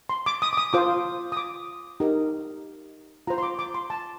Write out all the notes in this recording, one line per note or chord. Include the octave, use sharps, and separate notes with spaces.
C6
D6
D#6
D6
D#6
F4 C5 D6
D#6
D6
D#4 G4 A#4
F4 C5 A#5
C6
D6
D6
C6
A5